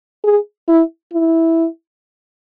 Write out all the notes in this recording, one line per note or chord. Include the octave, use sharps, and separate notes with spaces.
G#4
E4
E4